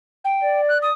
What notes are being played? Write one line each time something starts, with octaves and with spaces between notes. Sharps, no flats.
G5
D5
F#6
D#6